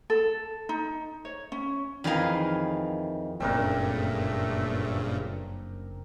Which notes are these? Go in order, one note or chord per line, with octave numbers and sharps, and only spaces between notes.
A4
D#4
C#5
C#4
F2 D#3 E3 G#4 A#4 F5
F#1 G2 A#2 C#3 A3 C4 D4 A#4